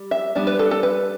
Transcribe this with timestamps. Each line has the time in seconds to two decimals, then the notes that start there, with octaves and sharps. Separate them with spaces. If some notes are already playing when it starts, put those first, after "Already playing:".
Already playing: G3
0.11 E5
0.35 G3 B3 D4
0.47 B4
0.59 A4
0.71 A4
0.83 B4